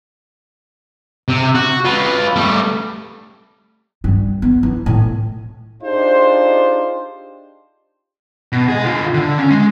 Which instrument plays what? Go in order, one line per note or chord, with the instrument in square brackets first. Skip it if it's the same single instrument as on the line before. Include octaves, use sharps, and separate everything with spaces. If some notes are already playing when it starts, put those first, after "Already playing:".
[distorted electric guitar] C3
F#4
F4 B4
G3 A3
[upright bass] G2
B3
E3
A2
[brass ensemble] D4 D#4 F4 G4 G#4 C5
[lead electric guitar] B2
G#4 D#5
D3 F4
D3
C#4
G#3